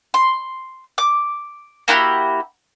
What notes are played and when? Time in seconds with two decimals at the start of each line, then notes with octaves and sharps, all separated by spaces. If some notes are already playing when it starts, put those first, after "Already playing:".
0.14 C6
0.98 D6
1.88 A#3 E4 F#4 G4